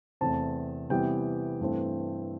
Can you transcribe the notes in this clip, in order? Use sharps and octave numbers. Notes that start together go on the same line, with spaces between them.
E2 C3 E3 A3 C4 A5
C3 E3 G3 B3 G5
G2 E3 A3 C4